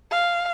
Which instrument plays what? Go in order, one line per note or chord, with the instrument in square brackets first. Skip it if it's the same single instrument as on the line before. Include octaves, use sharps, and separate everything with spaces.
[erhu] F5